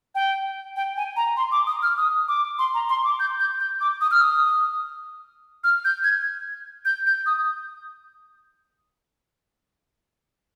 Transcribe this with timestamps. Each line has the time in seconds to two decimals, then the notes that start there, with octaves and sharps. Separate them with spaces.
0.15 G5
0.76 G5
0.97 G#5
1.16 A#5
1.37 C6
1.52 D6
1.67 D#6
1.82 F6
1.98 D#6
2.28 D6
2.59 C6
2.74 A#5
2.89 C6
3.04 D6
3.20 G6
3.40 G6
3.60 G6
3.81 D6
4.01 D#6
4.11 F6
4.21 D#6
5.64 F6
5.85 G6
6.04 G#6
6.85 G6
7.07 G6
7.26 D#6